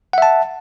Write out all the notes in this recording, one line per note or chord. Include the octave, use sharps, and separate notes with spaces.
E5 F#5 A5